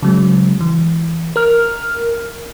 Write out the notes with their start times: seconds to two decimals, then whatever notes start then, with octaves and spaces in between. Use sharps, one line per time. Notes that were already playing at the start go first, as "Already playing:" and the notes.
0.03 C#3 F#3 G#3
0.61 E3
1.36 A#4 F6